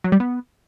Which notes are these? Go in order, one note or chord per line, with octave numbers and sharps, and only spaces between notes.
F#3
G3
B3